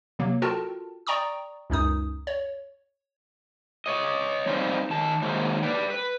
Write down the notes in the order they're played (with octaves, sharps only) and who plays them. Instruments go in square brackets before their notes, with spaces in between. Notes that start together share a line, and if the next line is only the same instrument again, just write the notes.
[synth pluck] C3 F#3 A#3
F4 F#4 A4 A#4 G5 A5
D5 G5 A#5 C#6 D#6
C#2 F#2 D#4 D#6
C#5
[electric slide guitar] C#5 D#5
G3 C4 D#4 B4 C5 F5
D#3 A5
D#3 F#3 G#3 A#3 C5
B4 D5 G5
B4